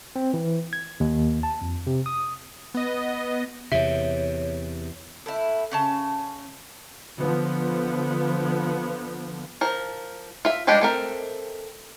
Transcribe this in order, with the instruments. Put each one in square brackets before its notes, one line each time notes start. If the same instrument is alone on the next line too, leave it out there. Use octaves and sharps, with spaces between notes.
[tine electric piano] C4
E3
G#6
D#2
A5
F2
C3
D#6
[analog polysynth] B3 D#5
[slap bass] E2 C3 [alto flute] C#5 [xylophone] E5
[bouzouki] A2 E4
C#3 C#4 A5
[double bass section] D3 F3 B3
[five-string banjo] F3 A#4
F4 E5
F3 G3 G#3 D4 G4
A3 C4 A#4